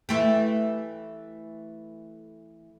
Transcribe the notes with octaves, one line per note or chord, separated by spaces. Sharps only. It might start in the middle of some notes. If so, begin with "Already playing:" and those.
E3 A3 G4